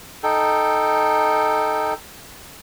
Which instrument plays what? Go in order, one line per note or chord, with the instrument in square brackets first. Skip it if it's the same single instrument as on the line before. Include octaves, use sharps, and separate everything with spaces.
[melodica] D#4 A4 G5